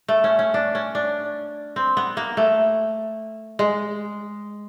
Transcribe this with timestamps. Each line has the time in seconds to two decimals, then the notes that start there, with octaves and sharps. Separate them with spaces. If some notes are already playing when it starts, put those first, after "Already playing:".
0.08 A3
0.24 C#4
0.39 C#4
0.54 D4
0.75 C#4
0.95 D4
1.76 C4
1.97 B3
2.17 A#3
2.37 A3
3.59 G#3